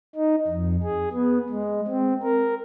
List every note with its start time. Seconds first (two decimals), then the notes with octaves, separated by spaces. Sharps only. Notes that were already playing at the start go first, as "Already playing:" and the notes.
0.16 D#4
0.47 F2
0.83 G#4
1.12 B3
1.50 G#3
1.87 C4
2.23 A#4